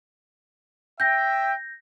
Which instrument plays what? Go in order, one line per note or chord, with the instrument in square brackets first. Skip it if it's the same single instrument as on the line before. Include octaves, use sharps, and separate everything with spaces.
[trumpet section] E5 G5 [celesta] G6 A#6